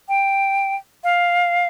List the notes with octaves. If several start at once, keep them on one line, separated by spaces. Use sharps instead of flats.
G5
F5